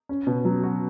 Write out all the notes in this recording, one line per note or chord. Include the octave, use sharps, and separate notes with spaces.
C#4
B2
F#3
F#4